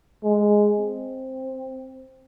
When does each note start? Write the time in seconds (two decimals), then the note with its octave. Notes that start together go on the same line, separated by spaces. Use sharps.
0.24 G#3
0.79 C4